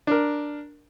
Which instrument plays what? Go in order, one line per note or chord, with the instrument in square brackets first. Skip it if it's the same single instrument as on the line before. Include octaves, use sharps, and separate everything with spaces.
[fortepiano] D4 A#4